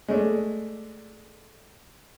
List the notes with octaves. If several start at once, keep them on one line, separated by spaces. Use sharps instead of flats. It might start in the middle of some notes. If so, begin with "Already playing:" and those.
G#3 A3 D4